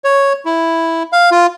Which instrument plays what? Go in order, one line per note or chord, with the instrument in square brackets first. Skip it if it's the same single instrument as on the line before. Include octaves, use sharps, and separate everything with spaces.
[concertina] C#5
E4
F5
F4